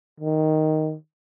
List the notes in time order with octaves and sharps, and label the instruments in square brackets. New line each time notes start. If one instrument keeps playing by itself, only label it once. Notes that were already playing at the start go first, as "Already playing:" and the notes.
[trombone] D#3